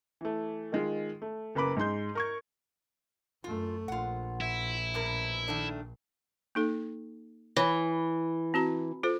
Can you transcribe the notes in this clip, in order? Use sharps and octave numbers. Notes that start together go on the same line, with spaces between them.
E3 A3
D#3 G#3 F4
A3
F#1 A#3 B4 A#5 B5 D6
G#2 G#3 C6 G6
A#4 C#6 G#6
F#2 A3 F4
A#1 F4 F#5
E4
G2 B2 A#4
D#3 A3 D4
A#3 D#4 A4
E3 C#5 B5
C4 F#4 A#5
F4 A4 C5